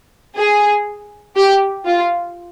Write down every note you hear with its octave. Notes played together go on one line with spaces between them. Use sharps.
G#4
G4
F4